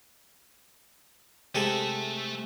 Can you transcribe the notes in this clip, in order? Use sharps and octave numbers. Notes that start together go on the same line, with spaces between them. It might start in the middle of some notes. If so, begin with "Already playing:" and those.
C3 G#3 A3 A4 A5